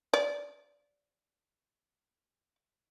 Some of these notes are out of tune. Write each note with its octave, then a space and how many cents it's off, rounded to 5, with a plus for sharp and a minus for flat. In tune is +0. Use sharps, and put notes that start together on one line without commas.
D5 -15